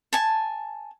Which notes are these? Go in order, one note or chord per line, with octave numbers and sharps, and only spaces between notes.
G#5 A5